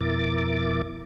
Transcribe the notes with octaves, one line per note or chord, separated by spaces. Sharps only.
F2 B2 E4 A#4 D6 A6